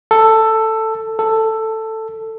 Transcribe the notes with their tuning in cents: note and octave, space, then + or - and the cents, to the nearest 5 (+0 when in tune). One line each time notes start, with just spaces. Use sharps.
A4 +10
A4 +10